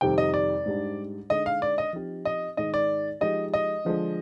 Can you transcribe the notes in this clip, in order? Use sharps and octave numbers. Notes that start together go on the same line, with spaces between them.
F2 C3 D#3 G3 C4 G5
D#5
D5
G#2 G3 D4
D3 G#3 D#4 D#5
F5
D5
D#5
F3 C4 D#4 G4
D#5
G#2 D#3 G#3 D#5
D5
F3 G#3 D#4 G4 D#5
D#5
D3 F3 G#3 D4